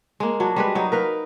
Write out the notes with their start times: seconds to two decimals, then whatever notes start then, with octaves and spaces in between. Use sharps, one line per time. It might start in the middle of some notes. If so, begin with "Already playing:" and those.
0.20 G#3 A#3
0.40 F#3 D4
0.56 G3 G#3 B4
0.75 F#3 D#4
0.92 A#4 B4 F5